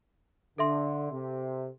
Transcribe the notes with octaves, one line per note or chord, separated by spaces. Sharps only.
D3 A4 E5 C6
C3